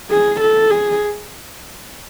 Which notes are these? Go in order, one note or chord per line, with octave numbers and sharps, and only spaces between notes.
G#4
A4
G#4